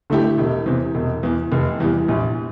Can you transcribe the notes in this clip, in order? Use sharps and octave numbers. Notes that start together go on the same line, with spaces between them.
D3 A3 E4 G4
E1
E2 C3
E1
E2 E3
F1
E2 E3 G3
A#1